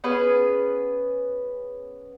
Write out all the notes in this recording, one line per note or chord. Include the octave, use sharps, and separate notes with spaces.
B3 C#4 G#4 B4